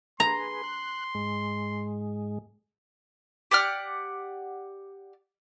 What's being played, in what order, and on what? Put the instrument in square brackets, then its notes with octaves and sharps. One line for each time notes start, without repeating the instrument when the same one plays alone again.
[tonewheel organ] G#4 B4 [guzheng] A#5 [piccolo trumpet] C6
[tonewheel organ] F#6
G#2 G#3
[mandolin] G4 D5 F#5 F6